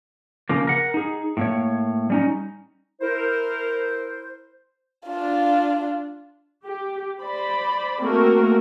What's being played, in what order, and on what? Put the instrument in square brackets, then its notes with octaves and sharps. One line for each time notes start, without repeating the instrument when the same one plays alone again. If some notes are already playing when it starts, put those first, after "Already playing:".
[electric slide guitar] C#3 F3 A#3
A#4 F#5
D#4 G#4
A2 A#3 C#5
G3 C#4 D#4
[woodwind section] E4 A#4 C5
[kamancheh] D4 F4
[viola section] G4
C5 D5 B5
A3 A#3 C4 F#4 A#4